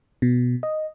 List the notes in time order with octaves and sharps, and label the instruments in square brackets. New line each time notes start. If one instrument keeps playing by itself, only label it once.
[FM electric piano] B2
D#5